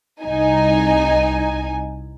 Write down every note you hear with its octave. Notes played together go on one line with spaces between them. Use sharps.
C2 D#4 G#5